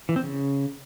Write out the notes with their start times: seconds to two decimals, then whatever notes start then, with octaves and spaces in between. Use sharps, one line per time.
0.09 E3
0.16 C4
0.23 C#3